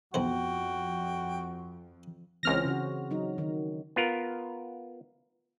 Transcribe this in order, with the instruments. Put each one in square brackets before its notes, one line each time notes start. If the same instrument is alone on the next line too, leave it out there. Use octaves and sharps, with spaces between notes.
[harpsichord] B1 E4 C5 [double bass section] F2 [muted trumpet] F#4 [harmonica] G5
[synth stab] C#2 F6 A#6 [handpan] E3 C4 C#4
[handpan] C#3 F#4
F#3 D#4
D#3
[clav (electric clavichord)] B3 F4 A#4